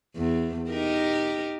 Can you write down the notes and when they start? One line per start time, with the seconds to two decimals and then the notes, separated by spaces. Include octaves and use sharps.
0.16 E2
0.69 D#4 G4 A#4